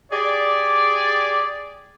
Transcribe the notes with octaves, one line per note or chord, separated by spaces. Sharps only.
G4 G#4 D5